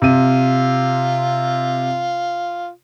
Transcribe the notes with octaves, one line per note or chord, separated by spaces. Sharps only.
C3 F4 D#7